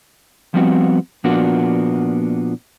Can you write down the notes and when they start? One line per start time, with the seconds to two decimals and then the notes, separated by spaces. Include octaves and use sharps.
0.54 F3 G3 B3 C4 F#4
1.24 A#2 F3 A#3 B3 D4 F#4